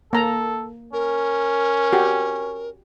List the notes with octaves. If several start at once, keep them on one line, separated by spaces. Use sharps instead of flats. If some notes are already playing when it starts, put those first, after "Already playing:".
A#3 A4 A#5
C#4 A#4
F#4 G4